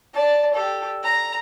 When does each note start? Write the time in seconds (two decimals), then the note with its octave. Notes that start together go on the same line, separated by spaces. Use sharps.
0.14 D5 A5
0.53 G4 A4
1.03 A#5